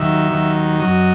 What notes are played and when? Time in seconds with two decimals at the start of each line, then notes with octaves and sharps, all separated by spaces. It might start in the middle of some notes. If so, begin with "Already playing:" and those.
Already playing: D#2 D#3 F#3 E5
0.32 D#2 D#3 F#3
0.80 F#2 F#3 D#5